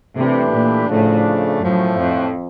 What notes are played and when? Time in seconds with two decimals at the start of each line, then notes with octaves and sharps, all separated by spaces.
0.16 C3 E3 A3 D4 G4 B4
0.52 A#2
0.88 A2 C#3 F3 A3 D4
1.60 F#2 A2 F3 A3
1.96 F2